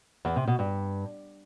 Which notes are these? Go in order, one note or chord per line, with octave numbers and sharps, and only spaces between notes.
E2
C3
B2
G2